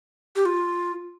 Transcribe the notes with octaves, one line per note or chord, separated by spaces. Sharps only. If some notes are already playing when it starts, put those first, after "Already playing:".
G4
F4